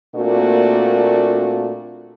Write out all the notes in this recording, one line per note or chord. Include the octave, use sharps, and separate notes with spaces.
A#2 A3 A#3 C4 D4 F#4